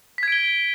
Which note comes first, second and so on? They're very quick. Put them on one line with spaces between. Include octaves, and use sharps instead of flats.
B6 G#6 D7 G7